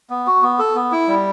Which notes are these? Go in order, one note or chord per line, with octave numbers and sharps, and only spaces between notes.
B3
F#4
B3
A4
B3
E4
G3